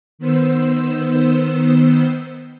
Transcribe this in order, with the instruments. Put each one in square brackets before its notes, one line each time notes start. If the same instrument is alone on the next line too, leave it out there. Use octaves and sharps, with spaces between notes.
[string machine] D#3 B3 C5 E6